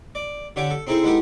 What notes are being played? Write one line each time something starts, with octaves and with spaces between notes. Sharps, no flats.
D5
D3 G4 C#5 E5 G5 A5
A4
C4 D#4 E4 G#4 A4 C5
G#3 B3 D#4 E4 G4 A4